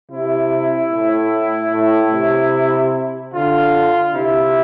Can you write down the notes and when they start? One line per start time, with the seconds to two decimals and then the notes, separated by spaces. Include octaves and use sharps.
0.11 C3 E4
0.92 A2
1.73 A2
2.13 C3
3.34 D3 F4
4.14 C3 E4